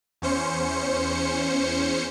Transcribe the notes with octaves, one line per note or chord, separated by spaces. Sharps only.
E2 C#4 C5 C#7